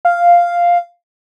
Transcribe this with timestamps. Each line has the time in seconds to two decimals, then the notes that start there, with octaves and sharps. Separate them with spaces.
0.05 F5